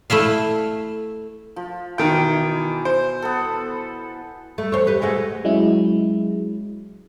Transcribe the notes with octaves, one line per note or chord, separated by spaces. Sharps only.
A3 E4 E5 F5
F3
B2 D#3 E3 G5
C5
B3 A4
A3
E2 C5 C#5
G4 B4
G#3 A3 F#4
F#3 G#3 C#4 E4